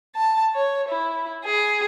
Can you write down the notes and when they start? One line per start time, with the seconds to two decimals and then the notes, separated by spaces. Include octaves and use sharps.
0.16 A5
0.54 C#5
0.88 E4
1.45 G#4